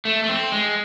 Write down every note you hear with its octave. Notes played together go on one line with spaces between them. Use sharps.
A3
A3
C4
G#3